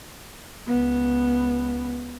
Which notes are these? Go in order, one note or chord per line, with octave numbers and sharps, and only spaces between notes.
C#2 B3